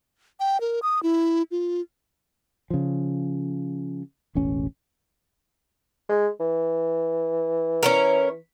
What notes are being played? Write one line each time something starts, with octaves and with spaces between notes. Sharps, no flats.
G5
A#4
D#6
E4
F4
C#3 F3
E1 A1 C#4
G#3
E3
C#4 E4 A#4